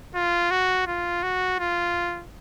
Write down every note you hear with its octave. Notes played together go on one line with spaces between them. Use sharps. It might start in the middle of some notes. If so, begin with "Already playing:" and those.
F4
F#4
F4
F#4
F4